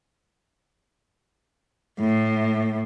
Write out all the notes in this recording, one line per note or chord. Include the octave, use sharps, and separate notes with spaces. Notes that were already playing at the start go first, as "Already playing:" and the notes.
A2